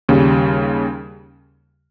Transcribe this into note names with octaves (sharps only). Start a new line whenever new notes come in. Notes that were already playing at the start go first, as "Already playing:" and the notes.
D#2 C#3 G3